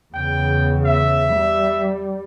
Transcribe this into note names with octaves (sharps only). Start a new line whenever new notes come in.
E2 C#3 G5
E5
G3